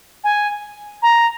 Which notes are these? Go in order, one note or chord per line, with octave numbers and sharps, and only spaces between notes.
G#5
A#5